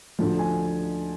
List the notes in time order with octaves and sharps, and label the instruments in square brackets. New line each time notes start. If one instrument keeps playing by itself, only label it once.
[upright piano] D2 D3 F3
G#5